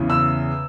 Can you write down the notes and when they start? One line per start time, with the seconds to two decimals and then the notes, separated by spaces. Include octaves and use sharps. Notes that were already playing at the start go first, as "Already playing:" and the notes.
Already playing: E2 C#3 E3
0.10 E6